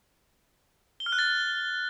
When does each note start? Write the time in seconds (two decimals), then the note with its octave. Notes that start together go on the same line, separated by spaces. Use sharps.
1.00 G7
1.06 F6
1.12 F#6
1.19 A6